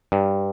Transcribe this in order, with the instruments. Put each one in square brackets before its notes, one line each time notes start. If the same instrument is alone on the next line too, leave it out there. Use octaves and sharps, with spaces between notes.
[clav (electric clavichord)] G2